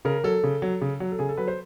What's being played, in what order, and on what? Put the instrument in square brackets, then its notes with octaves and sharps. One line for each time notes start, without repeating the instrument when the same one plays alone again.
[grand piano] C#3 A#4
F#3 A4
C#3
F#3
C#3
F#3
A4
C#3 G#4
A4
F#3 B4
C5